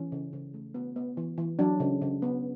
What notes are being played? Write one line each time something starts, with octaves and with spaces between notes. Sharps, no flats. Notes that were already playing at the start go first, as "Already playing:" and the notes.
Already playing: E3 C#4
C#3
C#3
A3
B3
B3
E3
E3
F#3 D4
C#3
C#3
B3